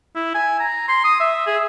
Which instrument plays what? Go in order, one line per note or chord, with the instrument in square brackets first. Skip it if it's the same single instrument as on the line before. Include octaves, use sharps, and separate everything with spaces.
[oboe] E4
G#5
A#5
C6
D#6
E5
G#4